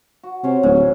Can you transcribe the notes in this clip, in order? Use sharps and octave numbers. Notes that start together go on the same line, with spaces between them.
F#4
C3 C#4 C5 C#5
D1 G#2
C#4